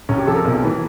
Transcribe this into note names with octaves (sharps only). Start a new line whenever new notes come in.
C2 C#4
G4
C3 F3 A4
A#4
B1
A2 E3